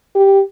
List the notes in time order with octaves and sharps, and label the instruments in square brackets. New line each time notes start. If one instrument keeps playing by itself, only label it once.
[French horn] G4